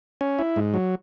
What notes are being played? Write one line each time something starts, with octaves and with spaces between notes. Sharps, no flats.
C#4
E4
G#2
F#3